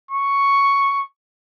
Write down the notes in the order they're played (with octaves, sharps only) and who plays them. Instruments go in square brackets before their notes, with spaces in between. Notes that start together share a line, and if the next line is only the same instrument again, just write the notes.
[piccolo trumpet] C#6